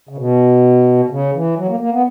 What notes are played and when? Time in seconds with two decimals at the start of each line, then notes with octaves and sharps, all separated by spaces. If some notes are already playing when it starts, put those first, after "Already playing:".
0.09 C#3
0.18 B2
1.10 C#3
1.34 E3
1.56 F#3
1.68 A#3
1.80 A#3
1.92 B3